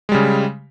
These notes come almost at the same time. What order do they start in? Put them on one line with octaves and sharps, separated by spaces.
G#3 G3 C#3